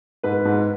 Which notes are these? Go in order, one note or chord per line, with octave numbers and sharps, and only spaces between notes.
G#2 B4
G#2